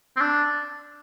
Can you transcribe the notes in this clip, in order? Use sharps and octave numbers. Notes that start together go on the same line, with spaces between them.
C4
D4